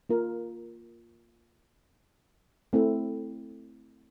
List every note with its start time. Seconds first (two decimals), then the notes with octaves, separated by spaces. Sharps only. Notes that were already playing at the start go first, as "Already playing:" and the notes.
0.09 A#3 F4 A#4
2.73 A3 C4 E4 A4